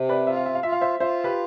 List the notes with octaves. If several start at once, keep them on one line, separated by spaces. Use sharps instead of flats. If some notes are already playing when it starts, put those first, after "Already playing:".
Already playing: C3
B4 D5
F4 E5
F5
E5
F5
F4 E5
F5
C5 E5
F4 C5 E5
G4 B4